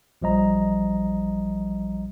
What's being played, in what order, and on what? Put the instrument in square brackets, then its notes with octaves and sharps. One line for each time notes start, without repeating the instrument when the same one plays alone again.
[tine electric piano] A#1 F3 G3 D#5 A#5